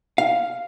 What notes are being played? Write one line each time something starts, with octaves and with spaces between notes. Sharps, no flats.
F5